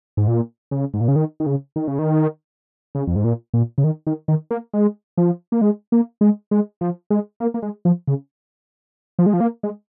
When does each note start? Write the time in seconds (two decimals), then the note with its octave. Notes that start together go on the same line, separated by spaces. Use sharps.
0.17 G#2
0.28 A#2
0.71 C#3
0.94 G#2
1.01 A#2
1.08 C#3
1.16 D#3
1.40 D#3
1.46 C#3
1.76 D#3
1.88 C#3
1.99 D#3
2.95 C#3
3.07 F2
3.16 G#2
3.24 A#2
3.54 A#2
3.78 C#3
3.84 D#3
4.07 D#3
4.28 D#3
4.51 A#3
4.73 G#3
5.18 F3
5.52 A#3
5.61 G#3
5.92 A#3
6.21 G#3
6.51 G#3
6.81 F3
7.10 G#3
7.40 A#3
7.54 A#3
7.62 G#3
7.85 F3
8.08 C#3
9.19 F3
9.26 G#3
9.33 F3
9.40 A#3
9.63 G#3